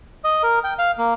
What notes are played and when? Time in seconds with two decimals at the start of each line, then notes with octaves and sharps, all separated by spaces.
0.24 D#5
0.43 A#4
0.64 G5
0.79 F5
0.98 A#3